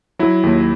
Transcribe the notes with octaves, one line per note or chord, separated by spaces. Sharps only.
F#3 E4
D#2